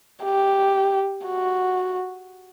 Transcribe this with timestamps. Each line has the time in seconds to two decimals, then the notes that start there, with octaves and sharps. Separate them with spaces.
0.24 G4
1.26 F#4